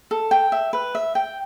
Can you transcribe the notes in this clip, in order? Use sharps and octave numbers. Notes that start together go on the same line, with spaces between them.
A4
G5
E5
B4
E5
G5